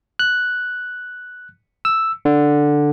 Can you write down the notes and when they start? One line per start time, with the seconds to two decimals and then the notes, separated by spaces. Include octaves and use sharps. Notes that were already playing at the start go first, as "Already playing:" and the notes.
0.19 F#6
1.85 E6
2.25 D3